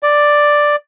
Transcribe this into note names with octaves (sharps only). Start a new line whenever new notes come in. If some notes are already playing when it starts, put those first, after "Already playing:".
D5